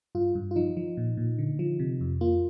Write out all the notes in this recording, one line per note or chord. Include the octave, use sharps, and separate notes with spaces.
G2 F4
G2
F4
F3 D#4
F3
A#2
A#2
D3
F3
C3
F2
A#3 F4